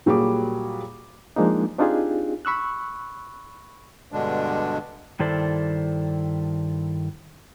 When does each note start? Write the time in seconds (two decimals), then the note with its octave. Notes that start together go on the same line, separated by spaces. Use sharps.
0.06 A#2 F#3 G3 A#3 G#4 D6
1.36 F3 G#3 A#3 D4 D#4
1.78 C4 D4 D#4 F4 G4 G#4
2.45 B5 C#6 E6 F#6
4.12 G2 B2 D3 G#3 D4
5.19 G2 D#3 E4 A4 C5 D5